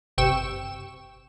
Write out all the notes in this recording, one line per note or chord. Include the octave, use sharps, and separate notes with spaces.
G1 C3 G5 C#6 E6 E7